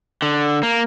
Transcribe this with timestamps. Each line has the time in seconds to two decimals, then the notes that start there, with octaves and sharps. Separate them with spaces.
0.22 D3
0.63 A#3